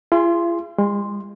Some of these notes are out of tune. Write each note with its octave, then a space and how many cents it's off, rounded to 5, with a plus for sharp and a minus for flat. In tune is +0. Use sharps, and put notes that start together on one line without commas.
F4 -45 G#4 -15 C6 +0
G#3 -40 C6 +0